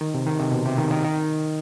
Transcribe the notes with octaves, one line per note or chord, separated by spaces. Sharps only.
D#3
C3
D#3
C3
B2
C3
D#3
D#3
D#3